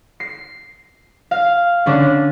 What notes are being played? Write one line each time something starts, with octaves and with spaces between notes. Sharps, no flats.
C7
F5
D3 C#4 D4